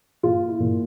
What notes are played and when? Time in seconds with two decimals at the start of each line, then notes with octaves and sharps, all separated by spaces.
0.23 A#2 F4
0.48 E4
0.60 A#2